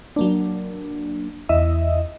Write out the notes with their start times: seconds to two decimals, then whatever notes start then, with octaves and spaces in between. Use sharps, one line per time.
0.16 F#3 A#3 D4
1.49 E2 E4 D#5 E5 D#6